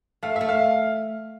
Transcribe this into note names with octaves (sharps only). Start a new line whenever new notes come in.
A3 F5
A3 E5
F5